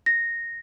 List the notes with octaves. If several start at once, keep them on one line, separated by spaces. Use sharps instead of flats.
A#6